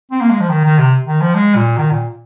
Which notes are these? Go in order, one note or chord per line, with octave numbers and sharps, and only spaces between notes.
C4
A#3
G#3
F3
D#3
D#3
C3
D#3
F3
G#3
A#2
D#3
A#2